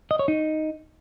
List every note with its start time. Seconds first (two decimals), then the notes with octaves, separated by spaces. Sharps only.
0.11 D#5
0.19 C#5
0.28 D#4